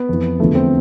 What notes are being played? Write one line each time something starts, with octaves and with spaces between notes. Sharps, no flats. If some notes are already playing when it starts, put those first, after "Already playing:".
Already playing: B3
F2 E3
E2 D3 F3 A3
C4